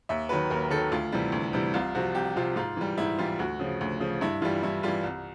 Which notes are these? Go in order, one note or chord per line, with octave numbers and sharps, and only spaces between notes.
D#2 E5
D#3 F#3 B4
D#2 A#4
D#3 F#3 A4
D2 F4
C3 E3 G3
D2
C3 E3 G3
C2 F4
C3 F3 F#4
C2 G4
C3 F3 F4
G#2 F4
E3 G3
G#2 E4
E3 G3 F4
D2 F#4
C#3 F3
D2
C#3 F3
G2 E4
E3 G3 F4
G2 E4
E3 G3 F4
C2